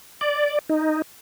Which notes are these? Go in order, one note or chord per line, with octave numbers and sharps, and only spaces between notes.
D5
D#4